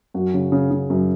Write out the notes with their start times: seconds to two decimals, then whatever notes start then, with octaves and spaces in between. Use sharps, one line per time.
0.14 F#2 F#4
0.34 C#3
0.52 C#3
0.71 C#3
0.90 F#2